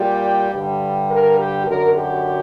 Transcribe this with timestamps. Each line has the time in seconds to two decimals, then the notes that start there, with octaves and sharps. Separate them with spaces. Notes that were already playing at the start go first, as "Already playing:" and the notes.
Already playing: A#2 G3 G4
0.51 G2 D3 G3
1.08 A#4
1.37 G4
1.65 F#2 D3 F#3 A#4
1.94 G4